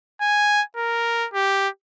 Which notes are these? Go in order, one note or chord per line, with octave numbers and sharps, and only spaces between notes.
G#5
A#4
G4